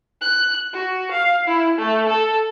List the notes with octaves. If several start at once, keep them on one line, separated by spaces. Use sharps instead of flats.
F#6
F#4
F5
E4
A3
A4